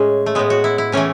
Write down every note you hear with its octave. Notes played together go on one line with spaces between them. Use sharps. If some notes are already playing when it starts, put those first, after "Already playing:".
Already playing: A2 G#3 C#4
A3
A2 G#3 B3
F#4
E4
E4
A2 E3 A3 C#4